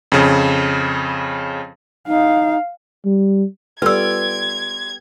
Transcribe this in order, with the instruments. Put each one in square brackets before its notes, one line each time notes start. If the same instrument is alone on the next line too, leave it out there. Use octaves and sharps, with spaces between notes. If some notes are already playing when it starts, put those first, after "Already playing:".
[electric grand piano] F2 C#3
[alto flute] D#4 [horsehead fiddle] F5
[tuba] G3
[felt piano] G3 B3 A4 [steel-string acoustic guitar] F4 D5 [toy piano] B4 E6 [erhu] G#6